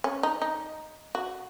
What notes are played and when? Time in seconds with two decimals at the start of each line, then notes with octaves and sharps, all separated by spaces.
0.04 C#4
0.23 D#4
0.42 D#4
1.15 F#4